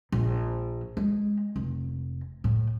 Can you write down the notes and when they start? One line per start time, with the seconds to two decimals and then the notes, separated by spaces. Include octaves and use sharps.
0.12 A#1
0.97 G#3
1.56 F1
2.44 A2